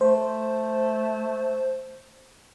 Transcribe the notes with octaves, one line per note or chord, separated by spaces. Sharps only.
A3 C5